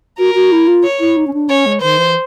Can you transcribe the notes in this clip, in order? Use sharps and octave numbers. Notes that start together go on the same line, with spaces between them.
F#4 A#4
F#4
E4
F4
C#5
E4
D#4
C#4
D4
C#4 C#5
G#3
D#3 C5
E3